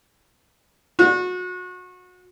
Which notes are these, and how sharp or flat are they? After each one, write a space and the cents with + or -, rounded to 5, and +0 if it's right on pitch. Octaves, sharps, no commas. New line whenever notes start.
F#4 -30